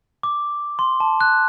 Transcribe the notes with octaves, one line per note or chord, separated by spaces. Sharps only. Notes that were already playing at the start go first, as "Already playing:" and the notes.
D6
C6
A5
F#6